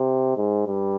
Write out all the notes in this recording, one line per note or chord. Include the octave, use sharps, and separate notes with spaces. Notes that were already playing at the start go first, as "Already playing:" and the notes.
Already playing: C3
G#2
G2